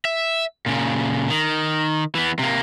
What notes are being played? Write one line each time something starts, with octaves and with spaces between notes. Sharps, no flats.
E5
A#2 C#3
D#3
E3 B3
C3 A#3